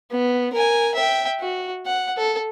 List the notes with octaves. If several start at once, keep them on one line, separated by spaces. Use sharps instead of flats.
B3
A#4 G#5
E5 G5
F#4
F#5
A4